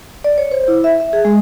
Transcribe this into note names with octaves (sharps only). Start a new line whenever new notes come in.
D5
C#5
C5
E4
E5
E5
G#4
G#3